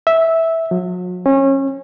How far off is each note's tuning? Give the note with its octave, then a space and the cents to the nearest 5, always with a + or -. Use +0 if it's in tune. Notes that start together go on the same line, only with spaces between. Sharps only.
E5 -10
F#3 -40
C#4 -30